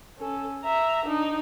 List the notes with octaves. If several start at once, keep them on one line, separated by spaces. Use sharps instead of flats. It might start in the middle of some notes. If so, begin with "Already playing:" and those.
C#4 A4
E5 A#5
D4 D#4